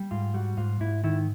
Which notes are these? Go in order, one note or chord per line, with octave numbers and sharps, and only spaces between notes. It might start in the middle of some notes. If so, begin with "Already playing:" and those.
Already playing: G3
G#2 F4
G3 F#4
G#2 F4
G#2 E4
D#3 E4